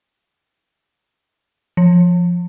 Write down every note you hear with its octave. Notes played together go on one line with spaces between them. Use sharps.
F3